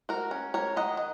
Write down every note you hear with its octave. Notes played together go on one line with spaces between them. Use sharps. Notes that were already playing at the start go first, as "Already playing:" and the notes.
F#4 A#4
C#4
A#4 C#5
D#3 D#5 F#5
D#5